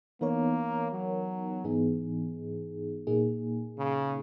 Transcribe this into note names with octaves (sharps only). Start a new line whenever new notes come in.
E3 A#3 B3 D#4 A#4 C#5
F#3
G#2 E3 B3 D#4 G#4
A#2 A#3 D#4 G#4
C#3